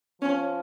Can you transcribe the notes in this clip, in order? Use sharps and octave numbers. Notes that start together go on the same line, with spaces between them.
F3 C#4